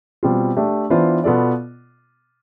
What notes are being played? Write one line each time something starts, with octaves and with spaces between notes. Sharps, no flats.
B2 G3 C4 F4
A3 D4 G4
E3 B3 D4 F4 C5
B2 B3 F4 A4 D5